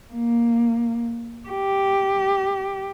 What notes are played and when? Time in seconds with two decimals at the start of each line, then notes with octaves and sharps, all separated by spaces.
0.13 A#3
1.49 G4